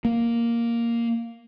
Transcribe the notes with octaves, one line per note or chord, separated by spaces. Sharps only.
A#3